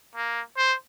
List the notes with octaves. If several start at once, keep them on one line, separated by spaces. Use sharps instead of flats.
A#3
C5